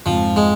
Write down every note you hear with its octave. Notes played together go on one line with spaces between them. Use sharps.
F2 G#2 F3
G#3